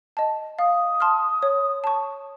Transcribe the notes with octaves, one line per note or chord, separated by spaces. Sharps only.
D#5 A5
F5 D#6
A5 C6 F6
C#5
A5 C#6